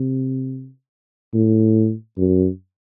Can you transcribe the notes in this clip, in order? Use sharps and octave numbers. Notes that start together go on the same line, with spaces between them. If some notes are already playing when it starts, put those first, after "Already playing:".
Already playing: C3
A2
F#2